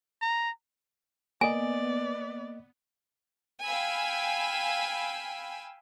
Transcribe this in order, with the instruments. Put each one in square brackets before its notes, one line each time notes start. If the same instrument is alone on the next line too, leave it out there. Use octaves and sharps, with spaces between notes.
[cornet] A#5
[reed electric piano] A#3 D#5 [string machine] B3 [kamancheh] D5 [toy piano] G#5
[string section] F5 G5 G#5 B5 E6